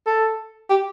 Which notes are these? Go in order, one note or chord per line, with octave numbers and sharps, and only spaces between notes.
A4
G4